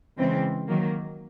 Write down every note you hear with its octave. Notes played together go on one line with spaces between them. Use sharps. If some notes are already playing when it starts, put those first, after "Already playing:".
C#3 E3 G#3 C4
D#3 F#3 A#3